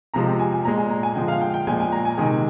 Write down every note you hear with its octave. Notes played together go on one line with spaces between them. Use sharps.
C3 F3 G#3 A#5
G5
G#5
G#5
A#2 G#3 A#5
G#5
A#5
G#5
D3 F3 G#3 G5
F5
G5
G5
A#2 F3 G#3 G#5
G#5
A#5
G#5
C3 D#3 G#3 G#5